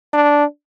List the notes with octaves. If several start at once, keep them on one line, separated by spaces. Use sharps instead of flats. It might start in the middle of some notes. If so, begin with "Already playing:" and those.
D4